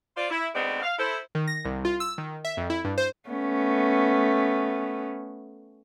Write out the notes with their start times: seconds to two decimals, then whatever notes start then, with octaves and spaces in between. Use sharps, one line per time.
0.17 F4 C5 D5
0.30 E4
0.54 D2 G#2 G#3 B3 C4 D5
0.83 F5
0.98 E4 A4 C5
1.35 D#3
1.47 A#6
1.65 C2
1.85 F4
2.00 E6
2.18 D#3
2.45 E5
2.57 F2
2.70 E4
2.84 G2
2.98 C5
3.29 A3 B3 C#4